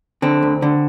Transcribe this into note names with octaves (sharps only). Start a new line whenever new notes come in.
D3 C4
D2
D3